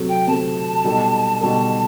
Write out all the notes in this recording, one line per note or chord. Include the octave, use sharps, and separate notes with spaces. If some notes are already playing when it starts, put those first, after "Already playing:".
Already playing: C3 F#3 A3
G5
C3 F#3 A3 A5
B2 G3 D#4 A4
B2 G3 D#4 A4 A5